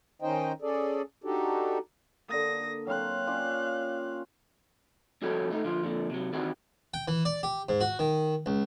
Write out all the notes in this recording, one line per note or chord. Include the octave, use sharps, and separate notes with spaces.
D#3 C#4 D#4 C5 D#5 G5
C#4 G#4 A4 D5
D4 D#4 F#4 G4 A4
D3 A#3 D#6 A#6
F#3 C4 F5 C6 F#6
C#4 F4 D5
F2 G3 F#4 A4 C#5 G5
A3 D#4
D3 F3 F4
F2 A#2 D3
C3 F#3
D#3 E3 G3 C4 F#4 G#4
G5
E3
D5
G4
G#2
F#4
D#3
C#2